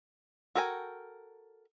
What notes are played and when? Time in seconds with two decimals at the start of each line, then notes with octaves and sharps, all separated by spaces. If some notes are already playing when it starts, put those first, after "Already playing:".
0.55 F#4 A4 A#4 G5 G#5